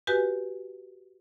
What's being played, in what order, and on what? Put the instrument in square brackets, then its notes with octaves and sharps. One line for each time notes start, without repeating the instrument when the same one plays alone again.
[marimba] F#4 G4 B4 G#5